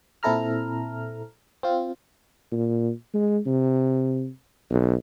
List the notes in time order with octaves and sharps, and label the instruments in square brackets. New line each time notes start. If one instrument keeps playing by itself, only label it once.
[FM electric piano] A#2 C4 E4 A4 A#5 F6
C4 F4
[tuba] A#2
G#3
C3
B1